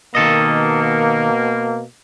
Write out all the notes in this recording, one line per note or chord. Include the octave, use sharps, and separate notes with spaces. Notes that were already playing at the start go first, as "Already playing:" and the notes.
B2 D#3 A#3 A4 D#5